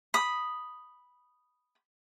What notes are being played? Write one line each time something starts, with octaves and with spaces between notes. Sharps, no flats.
B5 D#6